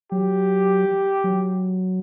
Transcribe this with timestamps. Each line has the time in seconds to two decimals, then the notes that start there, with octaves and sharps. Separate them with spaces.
0.12 F#3 G4
1.24 F#3